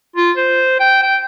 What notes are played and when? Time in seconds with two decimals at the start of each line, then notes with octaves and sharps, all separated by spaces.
0.16 F4
0.37 C5
0.80 G5
1.02 G5